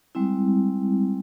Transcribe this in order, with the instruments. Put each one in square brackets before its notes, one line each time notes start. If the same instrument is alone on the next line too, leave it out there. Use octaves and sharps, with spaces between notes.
[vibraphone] G3 G#3 C4 E4